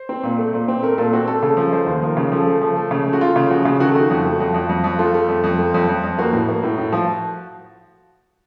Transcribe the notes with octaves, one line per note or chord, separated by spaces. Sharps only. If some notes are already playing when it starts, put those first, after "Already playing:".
Already playing: C5
C4
A#2
A3
A#2
C4
A3 A#4
A#2 A4
C4 F#4
A3 A4
C#3 A4
F3
A3 C5
D#2
F3 A#4
C#3
F3 A4
A3
F3
A3
C#3
A3
F#4
A3 F4
C#3
F3 F#4
C#3
D#3 F#4
A4
A3 F#4
F2
A3
F2
F2
F2
F2
A3 F4
A3
F2
F2
A3
F2
F2
F2
A#3 F#4
A2
A#3
A2
A2
F3